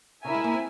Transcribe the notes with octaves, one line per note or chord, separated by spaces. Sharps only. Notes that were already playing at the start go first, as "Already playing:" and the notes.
C#3 E4 A#4 E5 G#5
G#3
A#3
C4